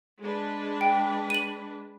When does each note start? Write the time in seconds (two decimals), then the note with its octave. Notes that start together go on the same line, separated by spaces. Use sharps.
0.21 G#3 D4 B4
0.81 G5
1.30 D#7 F#7